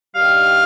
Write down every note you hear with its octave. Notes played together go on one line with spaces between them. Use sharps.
G2 D#3 G3 F5